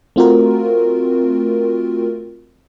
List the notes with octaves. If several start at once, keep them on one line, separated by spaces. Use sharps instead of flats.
A3 C4 F4 F#4 A#4